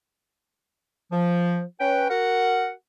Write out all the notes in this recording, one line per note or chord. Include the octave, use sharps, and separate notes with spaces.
F3
C#4 B4 G5
F#4 A#4 F#5